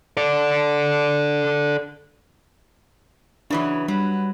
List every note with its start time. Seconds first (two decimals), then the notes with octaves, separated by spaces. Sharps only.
0.17 A4 D5
3.50 C#3 E3 F#3 D4 B4
3.88 F#3 G3 B4